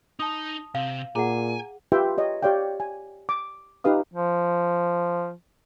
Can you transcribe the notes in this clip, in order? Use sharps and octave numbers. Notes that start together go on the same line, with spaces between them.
D#4 A5 D#6
C3 F5
A#2 G#4 F#5 G#5 A#5
F4 G4 B4 E5 G5 C6
G4 C#5 D#5
G4 C#5 D5 F5 G5
G#5
D6
D#4 F4 G4 B4 F5 D#6
F3